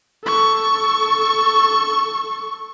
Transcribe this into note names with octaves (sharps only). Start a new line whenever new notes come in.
A4 C#6